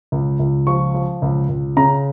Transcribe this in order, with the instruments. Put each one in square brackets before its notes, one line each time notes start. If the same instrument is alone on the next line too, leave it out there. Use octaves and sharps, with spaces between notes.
[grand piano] C#2
C#2
F3 C#6
F3
C#2
C#2
C#3 A#5